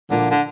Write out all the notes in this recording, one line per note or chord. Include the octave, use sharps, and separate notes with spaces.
A#2 D3 F3 A#3 F4
D3